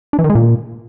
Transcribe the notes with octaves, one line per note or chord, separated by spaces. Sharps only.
D4
E3
D#3
G#3
A#2